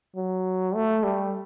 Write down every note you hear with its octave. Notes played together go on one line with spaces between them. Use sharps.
F#3
A3
G3